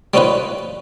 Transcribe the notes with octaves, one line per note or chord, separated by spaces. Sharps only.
G3 C4 C#4 D#4 F4 B4